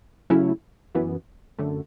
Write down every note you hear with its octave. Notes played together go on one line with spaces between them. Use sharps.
C#3 F#3 A3 C#4 E4
F#2 E3 B3
F#2 D3 A3